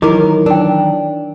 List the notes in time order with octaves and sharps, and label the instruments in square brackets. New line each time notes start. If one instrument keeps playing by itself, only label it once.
[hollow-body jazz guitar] D#3 E3 [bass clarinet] F#3 [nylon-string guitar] D#4 A#4 [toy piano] E4 D6
[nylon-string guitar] D4 [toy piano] A#4 G5